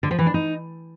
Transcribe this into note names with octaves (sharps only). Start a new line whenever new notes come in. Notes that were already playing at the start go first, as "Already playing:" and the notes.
D3
F3
E3
D4
D#4